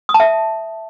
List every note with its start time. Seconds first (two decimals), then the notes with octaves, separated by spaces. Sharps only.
0.09 D#6
0.14 A5
0.20 E5